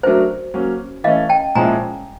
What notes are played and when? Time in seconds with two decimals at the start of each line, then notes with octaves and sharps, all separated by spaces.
0.03 F#3 A3 D4 F#4 A#4 C5
0.54 F#3 A#3 C#4
1.04 E3 A3 C#4 D#5 F5
1.29 G5 A5
1.55 A#2 F3 G#3 C#4 E4 G#5 A#5